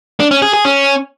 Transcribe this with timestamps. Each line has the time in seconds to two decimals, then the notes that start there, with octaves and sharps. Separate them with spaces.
0.20 D4
0.31 C#4
0.42 G#4
0.53 G#4
0.65 C#4